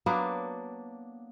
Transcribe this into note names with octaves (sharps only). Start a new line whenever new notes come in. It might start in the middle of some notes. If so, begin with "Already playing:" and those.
F#3 A#3 B3 D4